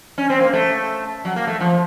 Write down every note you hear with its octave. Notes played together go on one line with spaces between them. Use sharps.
C#4
C4
A#3
A3
F#3
A#3
A3
F3